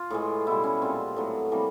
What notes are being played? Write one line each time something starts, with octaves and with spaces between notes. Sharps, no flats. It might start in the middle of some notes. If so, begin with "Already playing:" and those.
Already playing: F4
A2 E3 G#3
B2 G3 E4
C#4
A#2 F3 G#3 C4
A2 F#3 A3 B3
C3 E3 G3 A#3